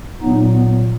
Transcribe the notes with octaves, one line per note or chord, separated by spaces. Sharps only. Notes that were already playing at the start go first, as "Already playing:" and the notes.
A#2 F#3 B3 D#4
B3